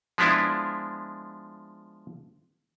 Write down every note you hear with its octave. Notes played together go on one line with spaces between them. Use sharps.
F3 G#3 B3 D4 E4 F4